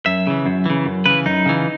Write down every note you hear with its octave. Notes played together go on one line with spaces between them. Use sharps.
F#2 E5
C#3 E3
F#2
C#3 E3
F#2
C#3 E3 B4
F#2 D#4
C#3 E3